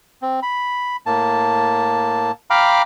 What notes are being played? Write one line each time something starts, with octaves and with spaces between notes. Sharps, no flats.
C4
B5
A2 A#3 A5
F5 G5 A#5 B5 D6 F6